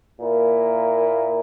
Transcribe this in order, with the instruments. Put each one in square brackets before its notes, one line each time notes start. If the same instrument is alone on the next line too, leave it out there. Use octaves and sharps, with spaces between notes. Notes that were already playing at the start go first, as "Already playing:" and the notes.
[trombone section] A#2 A#3 E4 A#4